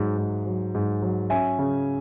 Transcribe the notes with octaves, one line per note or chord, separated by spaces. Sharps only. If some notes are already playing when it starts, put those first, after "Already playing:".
Already playing: G#2 F#3
G#2
F#3
G#2
F#3
C#4 E5 G#5
C#3